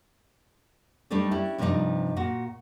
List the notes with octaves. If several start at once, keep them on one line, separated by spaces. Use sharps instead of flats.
G3 A3 D4 D#4 A4
C#4 D4 E4 G4
G2 C3 F3 G3 D4 D#4
A#2 F#4